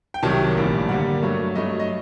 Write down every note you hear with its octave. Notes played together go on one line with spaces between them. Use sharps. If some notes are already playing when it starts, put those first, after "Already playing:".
G5
C2 C3 D#3 F#3 A5
A#1 A2 G3 A#3
G2 D3 G3 A#3 F#5
G2 F#3 A3
G2 F#3 A3 D#5
D#5